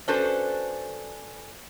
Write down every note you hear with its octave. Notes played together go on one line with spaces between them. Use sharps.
C#4 D4 F#4 A4 B4 C5